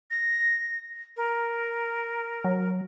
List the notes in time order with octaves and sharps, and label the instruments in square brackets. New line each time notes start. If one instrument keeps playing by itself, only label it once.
[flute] A#6
A#4
[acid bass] F#3